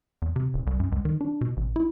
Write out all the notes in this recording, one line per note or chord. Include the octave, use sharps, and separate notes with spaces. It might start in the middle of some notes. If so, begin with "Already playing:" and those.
E2
C3
D#1
C2
F#2
C#2
D#3
D4
B2
A1
E4